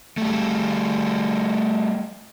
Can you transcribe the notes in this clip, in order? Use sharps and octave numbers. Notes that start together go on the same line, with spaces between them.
G3 A3